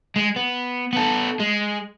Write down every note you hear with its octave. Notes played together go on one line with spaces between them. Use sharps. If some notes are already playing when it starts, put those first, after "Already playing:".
G#3
B3
B3 A4
G#3